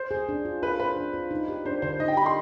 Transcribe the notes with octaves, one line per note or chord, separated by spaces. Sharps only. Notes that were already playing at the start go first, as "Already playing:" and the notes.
Already playing: C5
G#4
D4
F4
F4 B4
B4 C5
D4
F4
D#4
G4
D4 C5
D3 C5
D#4 D#5
G5
G4 B5
C6